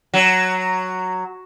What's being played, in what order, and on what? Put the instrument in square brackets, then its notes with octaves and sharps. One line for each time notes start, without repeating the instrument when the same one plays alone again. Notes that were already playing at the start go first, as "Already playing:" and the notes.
[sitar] F#3